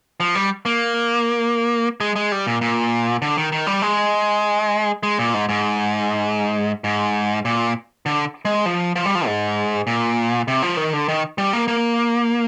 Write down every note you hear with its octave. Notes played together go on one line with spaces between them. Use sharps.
F3
G3
A#3
G#3
G#3
G3
A#2
A#2
D3
D#3
D#3
G3
G#3
G#3
A#2
G#2
G#2
G#2
A#2
D3
G#3
F3
F3
G3
F3
G#2
A#2
C3
F3
D#3
D3
D#3
G3
A#3
A#3